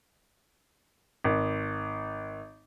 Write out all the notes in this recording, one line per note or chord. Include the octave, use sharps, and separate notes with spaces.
G#1